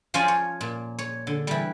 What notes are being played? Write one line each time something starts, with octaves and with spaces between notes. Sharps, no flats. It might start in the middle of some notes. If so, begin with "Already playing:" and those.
F3 C#4 F4 C5 D5 G#5
C#5
A#2
C#5
D3
E3 G3